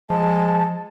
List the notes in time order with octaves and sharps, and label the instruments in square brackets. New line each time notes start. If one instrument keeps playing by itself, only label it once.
[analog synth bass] F3 [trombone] G#3 [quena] A5